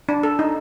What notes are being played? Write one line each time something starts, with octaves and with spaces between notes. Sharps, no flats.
D4
A4
D#4